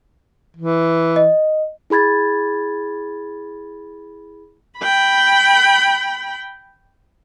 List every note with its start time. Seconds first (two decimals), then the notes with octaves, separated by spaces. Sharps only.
0.57 E3
1.16 D#5
1.90 E4 G#4 B5 G#6 A6
4.80 G5 B5